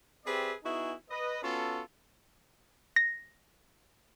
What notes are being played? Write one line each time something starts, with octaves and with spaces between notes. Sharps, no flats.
C4 G4 G#4 B4 D5 E5
B3 D#4 E4 F#4 G#4
B4 D#5
B3 C#4 F4 F#4 A4
A#6